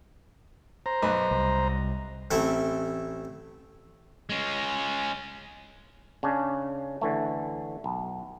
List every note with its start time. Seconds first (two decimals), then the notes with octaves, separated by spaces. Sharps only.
0.86 C5 A#5
1.02 B1 B4
1.31 C2
2.31 A1 A3 C4 E4
4.29 G#3 C#4
6.23 C#3 C#4 D4
7.01 D3 E3 A3
7.84 B1